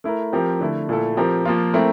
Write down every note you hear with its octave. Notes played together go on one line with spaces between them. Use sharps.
A3 E4 A#4
F3 C4 G4 A#4
D3 A3 E4
A#2 A3 E4 A4
F3 C4 G4 A#4
F3 A#3 F4
A3 C4 E4 A#4